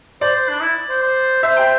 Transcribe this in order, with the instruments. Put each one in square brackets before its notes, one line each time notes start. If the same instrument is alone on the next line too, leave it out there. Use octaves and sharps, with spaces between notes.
[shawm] C5 [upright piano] D5
[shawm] C5
D4
E4
C5
C5
[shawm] C5 [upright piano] E5
[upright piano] G5